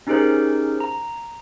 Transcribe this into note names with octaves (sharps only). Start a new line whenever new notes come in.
C#4 D#4 G4 G#4 A#4 C5
A#5